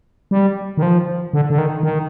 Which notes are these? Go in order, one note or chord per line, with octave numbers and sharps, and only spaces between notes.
G3
D#3
F3
D3
D3
D#3
D#3